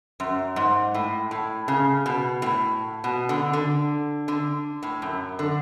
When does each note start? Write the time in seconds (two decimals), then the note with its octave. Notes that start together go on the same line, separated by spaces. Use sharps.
0.20 F#2
0.56 G#2
0.94 A2
1.31 A2
1.68 C#3
2.06 B2
2.42 A2
3.04 B2
3.29 D3
3.53 D3
4.28 D3
4.83 A2
5.02 F#2
5.39 D3